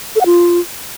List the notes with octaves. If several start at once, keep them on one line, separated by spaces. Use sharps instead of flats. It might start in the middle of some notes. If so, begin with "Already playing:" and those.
A4
F#5
F4